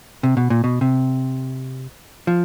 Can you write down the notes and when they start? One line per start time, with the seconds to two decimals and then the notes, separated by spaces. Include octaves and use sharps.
0.23 C3
0.37 B2
0.50 A#2
0.64 B2
0.81 C3
2.27 F3